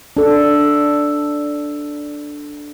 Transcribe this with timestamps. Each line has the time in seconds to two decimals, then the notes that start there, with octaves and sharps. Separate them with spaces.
0.17 D4 A4